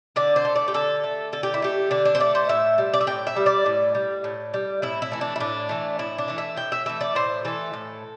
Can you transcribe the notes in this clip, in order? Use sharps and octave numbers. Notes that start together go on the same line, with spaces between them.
D3 D5
C5
A3
D5
G4
D3 A4
A3
D3 A4
G4
E4
A3 G4
D3 D4
D4
C5
A3 D5
C5
A2 E5
G3
D5
E5
A2 G5
E5
G3
D5
A2
G3
A2
G3
A2 E4
E4
E3 A3
D4
E4
A2 D4
E3 A3
A2 E4
D4
E3 A3
E5
A2 G5
E5
E3 A3 E5
D5
A2 C5
E3 A3 A4
A2